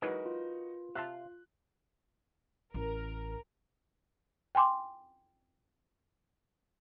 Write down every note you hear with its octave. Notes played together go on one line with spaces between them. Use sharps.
E3 F#3 G#3 D#4 F#4 A#4 B4
F4
C3 E5 F5 A5 C6 F#6
A1 A#4
G5 G#5 C6 D6